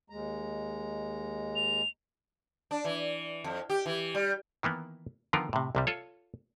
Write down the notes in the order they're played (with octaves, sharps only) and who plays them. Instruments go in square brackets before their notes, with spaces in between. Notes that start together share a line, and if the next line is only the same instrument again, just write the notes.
[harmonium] D#2 G#3 A#5
[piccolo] F7
[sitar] D4
E3
F2
G4
E3
G3
[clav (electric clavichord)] D#3 E3 A#3 B3
D3 D#3 F3 B3 F4 A#4
A2 C3
C2 C3 G3
F4 A4 C#5